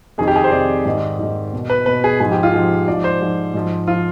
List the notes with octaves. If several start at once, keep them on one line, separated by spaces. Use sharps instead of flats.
F2 C3 D#3 G#4
G4
G#4
C5
F2 C3 D#3 D5
G#2 D#3
G#2 D#3
B2
B4
B2 B4
G#4
G#2 F3 G#4
G4
F4
G#2 F3 G4
G#2 F3 D5
C5
G#2 F3
G#2 F3
F3 F4